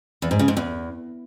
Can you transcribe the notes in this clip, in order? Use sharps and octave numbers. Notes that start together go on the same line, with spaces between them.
E2
G#2
C#3
G#2
E2